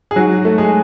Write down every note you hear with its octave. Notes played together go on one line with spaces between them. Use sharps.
G#4
G#2 F#3 F#4
A3
G#3 G#4